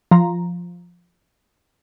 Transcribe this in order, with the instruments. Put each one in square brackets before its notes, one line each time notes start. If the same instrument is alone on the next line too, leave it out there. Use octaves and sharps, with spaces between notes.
[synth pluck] F3 A#5